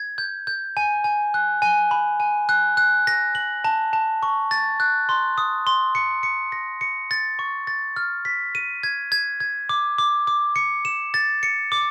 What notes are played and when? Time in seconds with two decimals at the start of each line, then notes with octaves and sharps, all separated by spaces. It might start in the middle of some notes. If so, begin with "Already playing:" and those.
Already playing: G#6
0.18 G6
0.47 G6
0.77 G#5
1.04 G#5
1.34 F#6
1.62 G#5
1.91 B5
2.20 G#5
2.49 F#6
2.77 F#6
3.07 A#6
3.35 F#7
3.64 A5
3.93 A5
4.23 C#6
4.51 A6
4.80 F#6
5.09 C6
5.38 D#6
5.67 C6
5.95 C#7
6.23 C#7
6.52 A#6
6.81 C#7
7.11 A6
7.39 C#6
7.67 A6
7.96 F6
8.25 B6
8.55 D#7
8.83 G#6
9.12 G#6
9.40 G#6
9.69 D6
9.98 D6
10.27 D6
10.56 C#7
10.85 E7
11.14 A6
11.43 C#7
11.72 D6